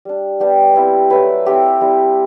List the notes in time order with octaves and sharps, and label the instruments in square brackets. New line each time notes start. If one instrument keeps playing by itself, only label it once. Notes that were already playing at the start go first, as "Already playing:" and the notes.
[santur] G3 D4
G3 B3 D4 G4
G3 C4 E4
F#3 A3 E4 B4
A3 C4 E4 G4
G3 C4 E4